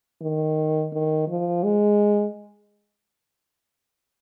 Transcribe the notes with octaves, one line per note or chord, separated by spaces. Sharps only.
D#3
D#3
F3
G#3